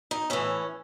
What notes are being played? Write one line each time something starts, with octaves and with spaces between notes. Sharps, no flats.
D#4
A2 E3 C#4